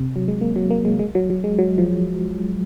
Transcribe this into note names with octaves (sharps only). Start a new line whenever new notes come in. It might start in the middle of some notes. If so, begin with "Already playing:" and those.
Already playing: C3
F#3
G#3
A#3
F#3
A#3
G#3
G#3
F#3
F#3
G#3
F#3
F3